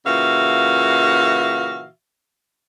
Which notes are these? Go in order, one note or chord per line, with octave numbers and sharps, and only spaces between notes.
A#2 C#3 E3 F#4 E5 F5